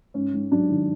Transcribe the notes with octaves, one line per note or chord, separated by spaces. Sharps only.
G#2 C#4
G#2
F#3 D4
D#3